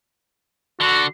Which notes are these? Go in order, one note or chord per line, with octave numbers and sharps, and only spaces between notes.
D3 F#4